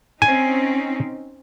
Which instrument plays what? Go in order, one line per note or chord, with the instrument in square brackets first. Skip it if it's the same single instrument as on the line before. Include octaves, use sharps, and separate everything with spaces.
[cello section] C4 C#4 D#4 [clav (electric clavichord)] G#5